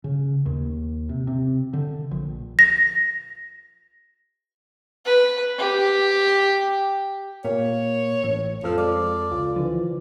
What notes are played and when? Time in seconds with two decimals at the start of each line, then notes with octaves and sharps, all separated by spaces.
0.04 C#3
0.46 D#2
1.09 C3
1.27 C3
1.73 D3
2.11 A#1
2.59 A#6
5.05 B4
5.58 G4
7.45 A#2 A#3 C#5
8.23 A1 A2
8.63 F2 F3 A4 F6
8.78 G#3 D5
9.32 C#2 F4
9.56 D3 E3 F3